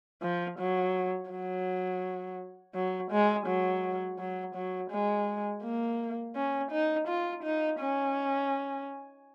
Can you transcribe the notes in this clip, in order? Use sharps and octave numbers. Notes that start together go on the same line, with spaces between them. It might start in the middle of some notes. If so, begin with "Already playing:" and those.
F3
F#3
F#3
F#3
G#3
F#3
F#3
F#3
G#3
A#3
C#4
D#4
F4
D#4
C#4